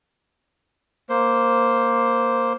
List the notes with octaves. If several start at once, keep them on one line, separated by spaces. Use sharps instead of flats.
A#3 C5